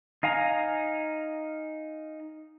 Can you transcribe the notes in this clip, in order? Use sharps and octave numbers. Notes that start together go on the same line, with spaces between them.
D#4 F5 G#5 A#5